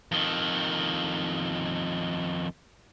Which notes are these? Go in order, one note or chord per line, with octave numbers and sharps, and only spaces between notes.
F2 D#3